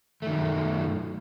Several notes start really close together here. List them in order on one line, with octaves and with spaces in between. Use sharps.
A3 D#3 B2 F#2